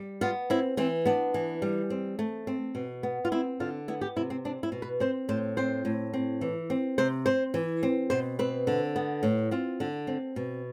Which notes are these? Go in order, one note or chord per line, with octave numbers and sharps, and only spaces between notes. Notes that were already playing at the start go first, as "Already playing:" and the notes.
Already playing: G3
B3 F4
C4 E4
E3 C4
B3 D4
E3
G3
C4
A3
C4
B2
B3
F4
C4 E4
D3 F4
B3 E4
G4
C3 E4
C4
C4 D4
E4
B2
B4
C4 C5
A2 C5
C4 C5
A2
C4
E3
C4
C3 C5
C4 C5
E3
C4
B2 C5
C4 B4
D3
B3
A2
C4 F4
D3
C4
B2